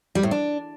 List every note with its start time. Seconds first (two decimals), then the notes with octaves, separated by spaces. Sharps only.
0.15 G3
0.23 A2
0.31 D4